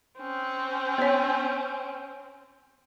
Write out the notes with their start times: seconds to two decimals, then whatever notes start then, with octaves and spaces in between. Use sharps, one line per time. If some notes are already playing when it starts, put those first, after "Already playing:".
0.19 C4 C#4
0.98 B3 C#5